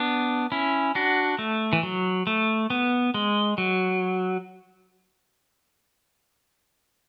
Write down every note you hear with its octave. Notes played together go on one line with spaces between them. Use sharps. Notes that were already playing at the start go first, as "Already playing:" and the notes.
Already playing: B3 D4
C#4 E4
D4 F#4
A3
E3
F#3
A3
B3
G#3
F#3